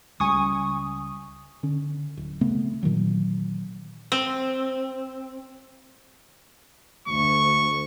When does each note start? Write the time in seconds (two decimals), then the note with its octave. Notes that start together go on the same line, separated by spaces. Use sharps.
0.20 C#2 G3 G#5 C#6 D#6
1.63 D3 C#4
2.17 D1
2.41 C#3 A3 B3 C4
2.83 A#2 D#3 E3 F#3
4.12 C4
7.08 D2 C#6